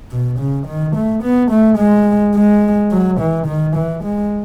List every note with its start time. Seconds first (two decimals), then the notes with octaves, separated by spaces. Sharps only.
0.11 B2
0.40 C#3
0.67 D#3
0.96 A3
1.23 B3
1.51 A3
1.79 G#3
2.35 G#3
2.91 F#3
3.20 E3
3.47 D#3
3.76 E3
4.04 G#3